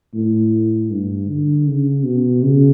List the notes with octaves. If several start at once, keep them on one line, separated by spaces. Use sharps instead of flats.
A2
G2
D3
C#3
B2
C#3